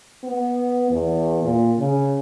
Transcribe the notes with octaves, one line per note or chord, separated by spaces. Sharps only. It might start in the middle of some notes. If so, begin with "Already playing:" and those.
B3
E2
A#2
C#3